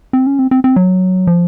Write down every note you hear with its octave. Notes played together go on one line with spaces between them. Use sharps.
C4
C#4
C4
C4
C4
F#3
F3